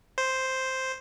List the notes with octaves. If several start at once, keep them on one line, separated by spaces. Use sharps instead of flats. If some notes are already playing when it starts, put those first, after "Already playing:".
C5